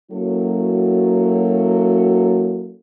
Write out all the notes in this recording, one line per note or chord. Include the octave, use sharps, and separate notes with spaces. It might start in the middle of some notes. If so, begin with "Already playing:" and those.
F#3 A#3 C#4 E4 F#4 A4